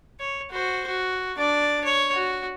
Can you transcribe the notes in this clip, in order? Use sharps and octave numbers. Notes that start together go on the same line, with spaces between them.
C#5
F#4 C5
F#4
D4 D5
C#5
F#4